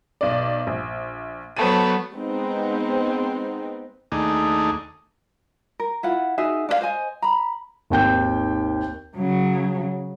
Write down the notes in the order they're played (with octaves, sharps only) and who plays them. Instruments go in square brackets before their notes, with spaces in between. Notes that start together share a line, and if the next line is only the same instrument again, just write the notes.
[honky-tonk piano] B1 D5
A#1
[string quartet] F#3 A3 B3 [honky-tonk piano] C5 A5 D#7
[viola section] G#3 B3 C4 D#4
[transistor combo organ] D#2 A3 D4 D#4 G#4
[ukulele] A#4
E4 F4 F#5
D#4 F#4 G#4 E5
D4 A4 F5
C5 D#5 G#5
A#5 B5
[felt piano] G#1 D#2 G5 G6
[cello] C#3 F#3